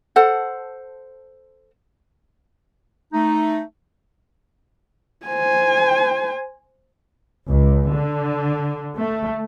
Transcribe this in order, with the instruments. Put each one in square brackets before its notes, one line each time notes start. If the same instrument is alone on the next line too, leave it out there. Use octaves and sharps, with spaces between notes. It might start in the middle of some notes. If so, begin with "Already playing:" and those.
[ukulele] A4 C5 F#5
[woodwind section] A3 D#4
[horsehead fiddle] C5 G#5
[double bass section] C#2
D3
A3